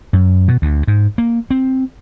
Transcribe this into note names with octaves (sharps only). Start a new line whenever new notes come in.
F#2
B2
D2
G#2
A#3
C4